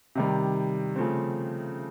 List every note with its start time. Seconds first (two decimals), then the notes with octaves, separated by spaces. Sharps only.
0.15 C3 D#3 G3
0.96 C#3 F3 A3 C4